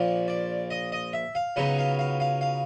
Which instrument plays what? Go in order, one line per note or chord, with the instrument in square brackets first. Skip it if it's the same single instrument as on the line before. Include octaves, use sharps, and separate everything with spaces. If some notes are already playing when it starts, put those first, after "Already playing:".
Already playing: [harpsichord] A#1 A#2 F3
D5
D#5
D#5
E5
F5
C#2 C#3 F#3 B3 D#4 F#5
F5
F5
F5
F5